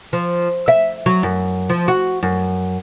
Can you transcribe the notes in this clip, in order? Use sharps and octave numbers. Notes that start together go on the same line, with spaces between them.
F3
E5
F#3
F#2
F3
F#4
F#2